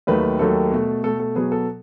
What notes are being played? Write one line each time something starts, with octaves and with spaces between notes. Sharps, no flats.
D#2 D#3 F#3 A3 B4
D#2 D#3 F#3 A3 A4
B2 A3
B2 A3 A4
A4
B2 F#3 B3 G#4
A4